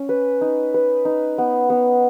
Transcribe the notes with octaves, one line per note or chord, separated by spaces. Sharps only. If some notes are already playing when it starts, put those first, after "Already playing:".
Already playing: C#4
B4
D#4
B4
D#4
B3
B3